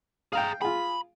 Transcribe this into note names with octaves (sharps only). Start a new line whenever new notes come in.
G#4 F5 G5 A#5
F4 G#4 B5